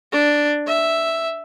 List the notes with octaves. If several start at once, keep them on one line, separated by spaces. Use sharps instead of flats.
D4
E5